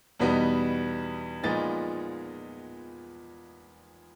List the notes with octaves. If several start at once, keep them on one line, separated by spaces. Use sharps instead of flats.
E2 B2 G3 B3 D#4
A#2 F3 G#3 B3 D#4 A6